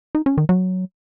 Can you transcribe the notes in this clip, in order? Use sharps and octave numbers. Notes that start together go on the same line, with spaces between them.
D#4
C#4
D#3
F#3